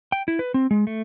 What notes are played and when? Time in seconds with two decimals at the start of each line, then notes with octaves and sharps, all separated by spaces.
0.12 G5
0.28 E4
0.39 B4
0.54 C4
0.71 G#3
0.87 A3